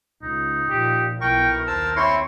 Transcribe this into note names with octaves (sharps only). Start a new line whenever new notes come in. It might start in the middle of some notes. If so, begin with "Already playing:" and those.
C#2 D#4
A#2 F3 G4
B1 E4 A#4 G5 C#6
D#2 C5 A5 E6
C4 E4 C#5 C6 C#6